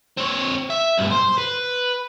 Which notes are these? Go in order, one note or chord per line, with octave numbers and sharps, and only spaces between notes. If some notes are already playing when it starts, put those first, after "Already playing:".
C4 C#5
E5
B1 G2
C5
B4